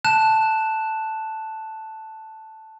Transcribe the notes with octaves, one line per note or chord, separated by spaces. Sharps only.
A5 F#6 E7